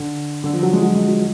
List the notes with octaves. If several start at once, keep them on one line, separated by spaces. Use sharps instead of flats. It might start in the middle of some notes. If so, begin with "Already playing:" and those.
Already playing: D3
D3
F3
F#3
G#3
F#3
G#3
F#3